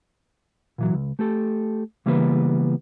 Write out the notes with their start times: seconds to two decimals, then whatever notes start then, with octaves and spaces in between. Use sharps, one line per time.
0.78 A#2 E3 F#3
0.94 C#2
1.19 A3 G4 A4
2.06 C#3 E3 G3 A#3 B3 B4